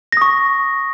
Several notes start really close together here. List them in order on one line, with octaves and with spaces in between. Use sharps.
A#6 D#6 C#6